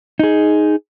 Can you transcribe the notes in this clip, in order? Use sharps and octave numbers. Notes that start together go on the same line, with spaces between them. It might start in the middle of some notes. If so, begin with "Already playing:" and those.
D#4 G#4